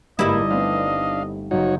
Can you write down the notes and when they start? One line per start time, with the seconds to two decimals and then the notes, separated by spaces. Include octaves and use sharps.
0.19 G1 G#2 G3 A#3 D#4 E4 D#5 D6
0.50 A3 B3 C4 D4 F5
1.51 F#1 D#4 F#4 C#5 G6